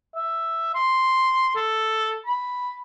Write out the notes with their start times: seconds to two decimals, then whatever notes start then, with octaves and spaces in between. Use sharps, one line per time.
0.16 E5
0.75 C6
1.55 A4
2.26 B5